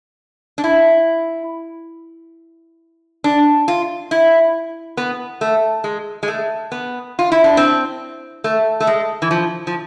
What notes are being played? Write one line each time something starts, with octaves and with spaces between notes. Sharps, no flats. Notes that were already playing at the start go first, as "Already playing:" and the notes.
D4
E4
D4
F4
E4
B3
A3
G#3
G#3
A3
B3
F4
E4
D4
C4
A3
A3
G#3
E3
F3
F3